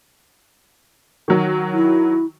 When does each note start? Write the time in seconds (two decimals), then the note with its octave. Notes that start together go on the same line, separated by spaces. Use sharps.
1.28 D#3 F#3
1.73 E4